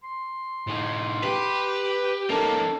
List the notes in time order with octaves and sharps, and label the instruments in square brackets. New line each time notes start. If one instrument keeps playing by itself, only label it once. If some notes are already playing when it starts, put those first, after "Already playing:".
[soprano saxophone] C6
[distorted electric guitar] A2 D#4
[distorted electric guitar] G4 [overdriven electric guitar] B4
[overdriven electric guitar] A#3 [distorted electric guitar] C#4 D#4 [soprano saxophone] A4